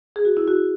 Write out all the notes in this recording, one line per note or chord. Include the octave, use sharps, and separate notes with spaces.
G#4
F#4
E4
F#4